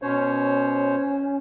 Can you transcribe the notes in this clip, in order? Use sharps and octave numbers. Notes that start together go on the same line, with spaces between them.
B2 C#4 C5 C#5